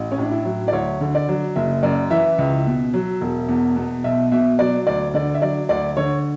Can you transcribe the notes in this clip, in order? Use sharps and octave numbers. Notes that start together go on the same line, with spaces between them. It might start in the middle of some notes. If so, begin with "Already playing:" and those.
Already playing: A1
C#4
A2 D4
E4
F#3
D5
D2 C#5
D3
D5
F#3
F#1 E5
F#2 D5
E3 E5
C#2
B2
F#3
E1
E2
B2
B1 E5
B2 E5
F#3 D5
D2 D5
D3 D5
E5
F#3 D5
D2 D5
D3 C#5